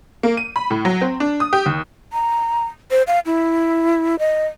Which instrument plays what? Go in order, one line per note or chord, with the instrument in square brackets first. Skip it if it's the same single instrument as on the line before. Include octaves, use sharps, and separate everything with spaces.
[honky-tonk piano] A#3
D#7
B5
A2
F#3
C4
D4
D#6
G4
D#2
[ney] A#5
C5
F5
E4
D#5